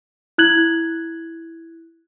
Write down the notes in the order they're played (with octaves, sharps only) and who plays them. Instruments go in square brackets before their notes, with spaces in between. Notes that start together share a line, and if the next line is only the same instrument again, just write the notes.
[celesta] E4 F#6 G#6 F#7